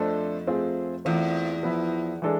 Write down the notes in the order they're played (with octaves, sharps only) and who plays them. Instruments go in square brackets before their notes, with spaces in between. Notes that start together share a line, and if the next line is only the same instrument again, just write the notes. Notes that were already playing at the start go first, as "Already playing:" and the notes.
Already playing: [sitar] F2 [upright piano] A3 D4 A4 C5
[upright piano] A3 C4 F4 G#4
[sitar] E2 [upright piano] A3 C4 F4
[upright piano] F3 B3 E4
E3 G#3 D4 A4